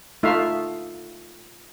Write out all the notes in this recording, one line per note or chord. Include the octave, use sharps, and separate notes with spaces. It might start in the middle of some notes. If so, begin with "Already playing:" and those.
A3 D#4 F4 E5 F5